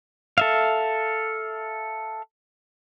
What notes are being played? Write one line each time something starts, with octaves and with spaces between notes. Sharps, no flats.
A4 E5 F5